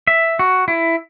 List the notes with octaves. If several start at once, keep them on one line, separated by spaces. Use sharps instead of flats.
E5
F#4
E4